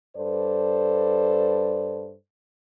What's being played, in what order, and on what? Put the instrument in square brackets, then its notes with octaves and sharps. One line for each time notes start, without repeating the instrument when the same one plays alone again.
[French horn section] G2 A4 B4 C5 D5